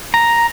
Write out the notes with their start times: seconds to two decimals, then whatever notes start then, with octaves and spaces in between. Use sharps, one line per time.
0.14 A#5